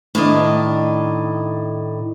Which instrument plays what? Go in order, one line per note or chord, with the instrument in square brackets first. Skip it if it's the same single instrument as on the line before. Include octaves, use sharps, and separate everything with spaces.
[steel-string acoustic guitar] A2 D#3 D4 D#5